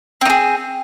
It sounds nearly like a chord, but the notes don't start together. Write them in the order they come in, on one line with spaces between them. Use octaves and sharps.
C4 D#4 G#4